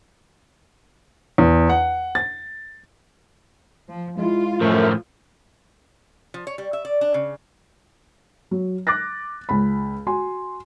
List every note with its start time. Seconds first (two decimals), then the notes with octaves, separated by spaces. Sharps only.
1.38 E2
1.69 F#5
2.15 A6
3.89 F3
4.19 G#3 E4 F4
4.61 F#2 A2 F3 A3 A#4
6.34 F3
6.47 C#5
6.58 G3
6.73 E5
6.85 D5
7.01 D4
7.14 C#3
8.51 F#3
8.87 D6 F#6 A6 A#6
9.49 C#2 B5
10.07 F#4 G#5 C6